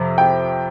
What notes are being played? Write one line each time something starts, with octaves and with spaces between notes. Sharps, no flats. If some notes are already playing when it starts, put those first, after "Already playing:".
Already playing: F2 C3
G5